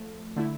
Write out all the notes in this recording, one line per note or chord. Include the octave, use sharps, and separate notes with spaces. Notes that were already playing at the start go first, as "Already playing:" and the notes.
Already playing: F3 A3
D3 A3 E4